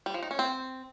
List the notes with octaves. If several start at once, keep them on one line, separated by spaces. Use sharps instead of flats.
G3
F3
D#4
C#4
C4